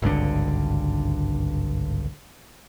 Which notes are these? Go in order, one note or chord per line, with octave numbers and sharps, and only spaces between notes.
G#1 C#2 G2 D3